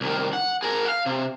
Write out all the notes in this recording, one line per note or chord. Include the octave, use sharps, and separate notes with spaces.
C2 D#3
F#5
G#4 A#4
F5 F#5
C3